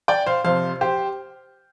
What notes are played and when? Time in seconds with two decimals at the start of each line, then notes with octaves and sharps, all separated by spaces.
0.08 D5 G5
0.26 C5 F5
0.45 F2 C3 F3 C5 F5
0.81 G4 C5